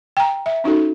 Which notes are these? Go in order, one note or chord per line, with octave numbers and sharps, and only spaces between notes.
G5 A#5
E5
C#4 D#4 F#4 A4